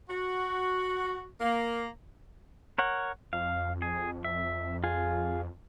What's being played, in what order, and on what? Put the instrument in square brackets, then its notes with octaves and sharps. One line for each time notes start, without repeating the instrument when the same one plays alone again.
[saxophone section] F#4
A#3
[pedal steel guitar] A#4 C#5 F#5
[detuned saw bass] F2 [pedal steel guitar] F5
[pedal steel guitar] G#4
E5
F4 G#4